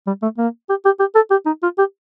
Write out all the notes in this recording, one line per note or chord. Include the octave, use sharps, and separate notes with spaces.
G3
A3
A#3
G4
G4
G4
A4
G4
D#4
F4
G4